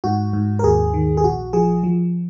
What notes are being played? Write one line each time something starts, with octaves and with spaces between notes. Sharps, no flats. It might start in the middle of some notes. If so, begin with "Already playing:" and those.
G#2 F#4
G#2
A#4
D#2 G#4
D#3
G#4
A#1 F#4
F3 G#4
F3